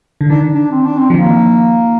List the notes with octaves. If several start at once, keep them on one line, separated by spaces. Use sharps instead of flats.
D3
D#3 D4
D4
C4
D4
C4
F3
D#3 A#3